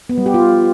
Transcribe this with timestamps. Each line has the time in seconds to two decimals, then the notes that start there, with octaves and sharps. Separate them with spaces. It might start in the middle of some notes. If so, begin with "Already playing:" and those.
0.09 B3
0.18 G3
0.26 G4
0.34 F4